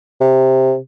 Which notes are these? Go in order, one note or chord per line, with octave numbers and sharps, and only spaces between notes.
C3